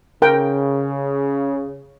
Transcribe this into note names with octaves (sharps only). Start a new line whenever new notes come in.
C#3 A#4 G5